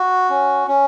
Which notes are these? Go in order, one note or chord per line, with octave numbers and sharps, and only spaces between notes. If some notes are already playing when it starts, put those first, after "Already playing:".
Already playing: F#4
C#4
C#4